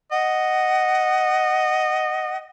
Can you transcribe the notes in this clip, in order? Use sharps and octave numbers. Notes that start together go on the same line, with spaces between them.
D#5 F#5